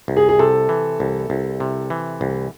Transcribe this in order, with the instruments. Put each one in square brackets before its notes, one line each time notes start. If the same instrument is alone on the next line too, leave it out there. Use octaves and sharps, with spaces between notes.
[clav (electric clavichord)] C2
[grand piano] G#4
G#4
[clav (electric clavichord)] C3 [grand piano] A4
[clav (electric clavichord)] E3
C2
C2
C3
E3
C2